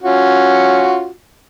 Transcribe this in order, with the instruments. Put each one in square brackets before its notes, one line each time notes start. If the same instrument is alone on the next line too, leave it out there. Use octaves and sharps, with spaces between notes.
[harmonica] C#4 F4 F#4